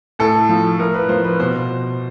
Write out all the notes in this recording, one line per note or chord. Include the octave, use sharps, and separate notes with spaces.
A2 A4
F3
A2 A#4
B4
F3 C5
B4
B2 C5